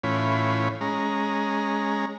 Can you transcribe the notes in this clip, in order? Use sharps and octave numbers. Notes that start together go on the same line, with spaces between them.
A2 E3 C#4 F4 C#5 B5
G#3 C#4 A#5